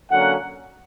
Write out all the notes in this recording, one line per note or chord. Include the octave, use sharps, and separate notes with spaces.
D3 F#3 A#3 C#4 F#5